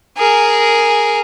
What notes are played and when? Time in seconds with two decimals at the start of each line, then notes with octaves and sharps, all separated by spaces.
0.18 G#4 A#4